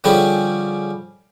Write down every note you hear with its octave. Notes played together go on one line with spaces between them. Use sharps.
D3 F3 G3 C#4 G4 G#4